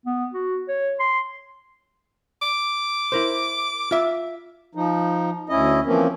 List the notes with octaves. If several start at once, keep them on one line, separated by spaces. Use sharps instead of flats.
B3
F#4
C#5
C6
D6
E4 A#4 C5
F4 E5
F3 D#4
D2 C#4 E4 D#5
E3 F3 A#3 C4 C#4